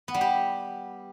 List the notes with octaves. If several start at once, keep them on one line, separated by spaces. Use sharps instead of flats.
B3
G3
G4